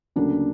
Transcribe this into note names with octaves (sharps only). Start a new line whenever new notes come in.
D2 C#3 F#3 A#3 D4